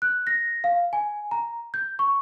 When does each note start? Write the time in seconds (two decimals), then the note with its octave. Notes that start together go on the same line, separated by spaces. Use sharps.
0.02 F#6
0.27 A#6
0.64 F5
0.93 G#5
1.31 A#5
1.74 G6
1.99 C#6